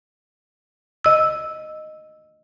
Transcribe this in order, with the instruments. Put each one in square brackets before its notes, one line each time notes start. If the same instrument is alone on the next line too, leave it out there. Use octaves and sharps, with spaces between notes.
[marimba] D#5 E6